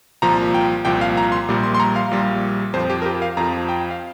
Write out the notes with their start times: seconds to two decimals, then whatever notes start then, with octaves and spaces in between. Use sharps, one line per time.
0.22 C2 A#2 F3 A#5
0.54 G5
0.85 C2 A#2 F3 G5
1.01 F5
1.17 A#5
1.32 C6
1.49 A#1 A#2 G3
1.63 C6
1.74 C6
1.80 A#5
1.96 F5
2.11 A#1 A#2 G3
2.74 F2 C5
2.77 F3
2.90 G4
3.02 A#4
3.06 G4
3.22 F5
3.37 F2 F3 A#5
3.69 G5
3.91 F5